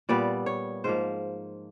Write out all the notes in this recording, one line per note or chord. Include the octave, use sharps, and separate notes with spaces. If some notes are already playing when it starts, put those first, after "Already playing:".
A#2 G3 B3 D5
C#5
G#2 F3 A#3 C5